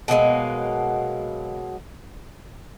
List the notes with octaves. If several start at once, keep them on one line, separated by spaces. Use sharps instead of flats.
B2 F#3 G#3 A#3